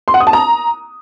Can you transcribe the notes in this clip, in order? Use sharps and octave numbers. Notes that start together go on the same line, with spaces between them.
C6
F#5
D#6
A5
A#5